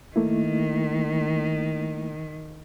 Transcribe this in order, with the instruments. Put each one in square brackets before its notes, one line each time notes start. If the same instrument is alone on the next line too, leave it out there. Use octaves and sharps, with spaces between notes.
[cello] D#3 [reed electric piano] A3 A#3 E4